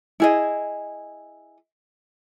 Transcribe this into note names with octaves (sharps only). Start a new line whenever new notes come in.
E4 G#4 D#5